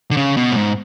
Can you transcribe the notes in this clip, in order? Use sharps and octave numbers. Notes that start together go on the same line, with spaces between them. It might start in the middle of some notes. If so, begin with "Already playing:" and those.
D3
C#3
B2
A2
G#2